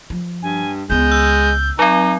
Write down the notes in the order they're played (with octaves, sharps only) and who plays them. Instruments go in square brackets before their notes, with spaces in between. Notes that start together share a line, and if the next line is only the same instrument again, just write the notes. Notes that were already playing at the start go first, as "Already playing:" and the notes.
[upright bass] F3
[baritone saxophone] G2 [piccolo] G#5
[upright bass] C#2 B3 [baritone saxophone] G#3 [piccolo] G6
[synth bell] E6
[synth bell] F#3 C4 [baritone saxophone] D#4